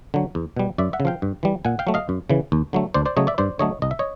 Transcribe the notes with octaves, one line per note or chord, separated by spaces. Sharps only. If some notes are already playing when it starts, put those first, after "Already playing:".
D3 F#3
E2
B2 G3
F#2 D5 E5
E5 F#5
C#3
F3 F5 G5
G2
E3 G3
A#2 F#5 G#5
F5 G5
F#3 A3
D#5 F5
F#2
C#3 E3
D#2
D3 F#3 A3
D2 C5 D5
C5 D5
C#3 F#3 A3 C#5 D#5
D5 E5
G2 C5 D5
D3 F#3 A3 C#5 D#5
C2 D#5
E5
C#5 D#5